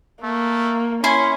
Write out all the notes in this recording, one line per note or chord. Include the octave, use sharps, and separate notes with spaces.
A3 A#3
C#4 E4 G#5 C6